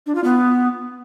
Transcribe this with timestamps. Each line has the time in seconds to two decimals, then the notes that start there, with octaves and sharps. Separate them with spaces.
0.06 D4
0.15 F4
0.24 B3